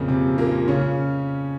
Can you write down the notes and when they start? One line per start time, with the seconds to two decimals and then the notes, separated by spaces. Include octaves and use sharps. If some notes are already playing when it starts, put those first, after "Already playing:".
Already playing: F2 A#2 C#3 F3 A#3
0.08 C3
0.38 A#2 A#3
0.68 C#3 C#4